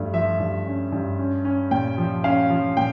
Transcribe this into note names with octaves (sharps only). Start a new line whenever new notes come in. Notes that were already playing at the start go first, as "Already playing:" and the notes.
Already playing: G2 F3 A3
F3 E5
G2
C#4
G2
C#4
C#4
A#2 G5
F3
C#4 F5
F3
A#2 G5